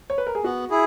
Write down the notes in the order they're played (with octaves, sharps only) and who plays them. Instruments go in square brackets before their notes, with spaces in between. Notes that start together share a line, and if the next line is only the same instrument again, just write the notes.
[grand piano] C#5
B4
A#4
G#4
[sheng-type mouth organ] B3 [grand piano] F#4
[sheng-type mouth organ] E4 G#4